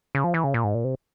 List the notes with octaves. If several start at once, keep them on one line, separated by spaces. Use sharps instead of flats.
C#3
F3
E3
C#3
A#2
G#2
A#2
C3